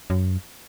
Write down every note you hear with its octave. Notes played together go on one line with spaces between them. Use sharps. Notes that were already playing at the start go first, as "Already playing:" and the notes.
F#2